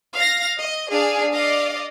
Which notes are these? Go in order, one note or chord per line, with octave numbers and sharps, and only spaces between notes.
F5 A#6
D#5
D4 G#4 F5
D5 D#5 F5